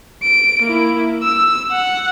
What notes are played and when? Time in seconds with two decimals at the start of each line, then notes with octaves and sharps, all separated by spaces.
0.23 D7
0.62 A#3 E4
1.23 E6
1.72 F#5